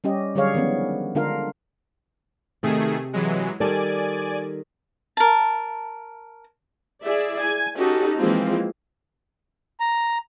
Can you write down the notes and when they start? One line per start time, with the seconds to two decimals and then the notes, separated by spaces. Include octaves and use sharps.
0.04 G3 C#4 G4 D#5
0.35 D3 F#3 G3 G#4 C#5 F5
0.54 D#3 F3 G#3 B3 C#4
1.15 D3 G#3 D4 F4 A#4 F5
2.63 C3 D#3 A3 G#4
3.13 E3 F#3 G#3
3.60 D#3 G3 A4 D5 G#5
5.17 A#4 A5
7.04 E4 G#4 D5 E5
7.40 G#5
7.76 C#4 D#4 F#4 G4 A4
8.19 E3 F3 G#3 A#3 C4 F4
9.80 A#5